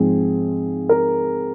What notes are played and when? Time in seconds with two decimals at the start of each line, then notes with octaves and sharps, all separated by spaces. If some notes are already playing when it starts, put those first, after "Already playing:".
Already playing: G#2 F3 G#3 C4 G#4
0.89 A#4